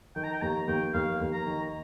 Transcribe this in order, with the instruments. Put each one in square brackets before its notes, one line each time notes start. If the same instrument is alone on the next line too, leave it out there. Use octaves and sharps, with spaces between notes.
[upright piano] D#3 [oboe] G5
[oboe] A#5
G5
[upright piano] D#2 [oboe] A#5
[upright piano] D#2 [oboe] G5
[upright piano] D#2 [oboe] F5
[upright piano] D#2
[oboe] A#5
[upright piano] D#3